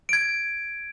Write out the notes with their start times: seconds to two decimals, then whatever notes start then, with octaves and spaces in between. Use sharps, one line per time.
0.09 G#6 D7